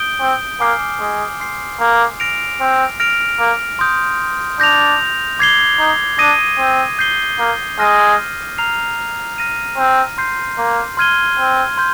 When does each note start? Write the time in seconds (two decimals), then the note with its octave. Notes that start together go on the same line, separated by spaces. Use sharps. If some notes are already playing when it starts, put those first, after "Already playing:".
Already playing: D#6 G6 D7 G7
0.21 C4
0.60 A#3 G#5 D6 F6 C7
1.00 G#3
1.40 C6 G6 C7
1.80 A#3
2.20 F6 A#6 D7 F7
2.60 C4
3.00 F6 A#6 D7 F7
3.40 A#3
3.79 C6 D#6 G6
4.59 D4 G6 A#6 F7
5.39 D6 G#6 C7 G7
5.79 D#4
6.19 D4 D#6 A#6 D#7
6.58 C4
6.99 G6 C7 G7
7.39 A#3
7.79 G#3 F6 A#6 D#7
8.58 A#5 F6 C7 F7
9.38 F6 A#6 D#7
9.78 C4
10.18 C6 G6 C7
10.58 A#3
10.97 C6 F6 G#6 D#7 G7
11.38 C4
11.78 C6 G6